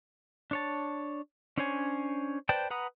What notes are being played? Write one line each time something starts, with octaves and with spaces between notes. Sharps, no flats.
D4 C#5 A5
C#4 D4 C5 C#5 G#5
B4 C5 D5 G5 A5
B4 F#5 A#5 B5 D#6